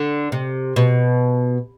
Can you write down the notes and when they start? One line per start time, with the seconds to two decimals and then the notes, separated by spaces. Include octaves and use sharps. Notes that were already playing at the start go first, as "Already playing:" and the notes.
Already playing: D3
0.32 C3
0.76 B2